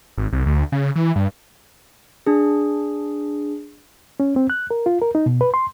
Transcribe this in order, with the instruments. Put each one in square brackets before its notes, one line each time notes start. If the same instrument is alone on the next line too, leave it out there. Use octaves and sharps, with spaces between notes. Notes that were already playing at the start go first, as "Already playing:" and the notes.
[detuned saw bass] G#1
C2
D2
C#3
E3
G2
[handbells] D4 G#4
[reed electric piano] C#4
C4
F#6
A#4
F4
A#4
D#4
B2
B4
C6